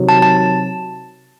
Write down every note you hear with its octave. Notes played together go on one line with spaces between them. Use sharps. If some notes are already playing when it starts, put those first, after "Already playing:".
Already playing: C3 D#3 F#3
A5
A5